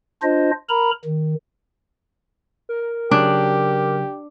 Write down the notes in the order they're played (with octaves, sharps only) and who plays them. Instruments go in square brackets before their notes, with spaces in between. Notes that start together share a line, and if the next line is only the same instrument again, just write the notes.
[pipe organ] D4 F4 C5 D#5
A#4 A#5 B5
D#3
[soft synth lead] A#4
[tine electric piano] C#3 F#3 [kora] D4 [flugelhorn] G4